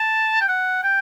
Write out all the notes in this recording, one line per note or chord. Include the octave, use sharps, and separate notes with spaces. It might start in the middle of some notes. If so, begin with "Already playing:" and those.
Already playing: A5
G5
F#5
G5